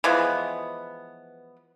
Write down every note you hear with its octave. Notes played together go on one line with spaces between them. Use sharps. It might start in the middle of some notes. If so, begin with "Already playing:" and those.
E3 F3 G#3 B3